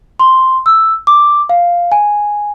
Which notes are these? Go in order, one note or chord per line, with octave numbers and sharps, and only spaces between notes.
C6
E6
D6
F5
G#5